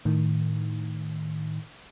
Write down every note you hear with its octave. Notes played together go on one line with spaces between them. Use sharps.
A2 D#3